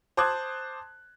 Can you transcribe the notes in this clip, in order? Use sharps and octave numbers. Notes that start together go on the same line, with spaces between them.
C5 A5 D6 D#6 F#6 G#6